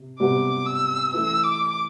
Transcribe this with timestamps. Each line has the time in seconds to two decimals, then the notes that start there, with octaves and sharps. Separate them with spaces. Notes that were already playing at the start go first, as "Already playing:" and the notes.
Already playing: C3
0.19 C3 G3 B3 F#4 B4 D6
0.66 E6
1.12 E3 A3 E4 B4 E6
1.44 D6